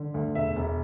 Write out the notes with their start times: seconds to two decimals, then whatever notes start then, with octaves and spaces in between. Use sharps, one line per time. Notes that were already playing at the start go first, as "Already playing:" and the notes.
Already playing: D3
0.14 D2
0.35 E1 E5
0.56 E1